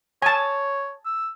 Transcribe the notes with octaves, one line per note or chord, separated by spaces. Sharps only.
C#5 G#5 A5
E6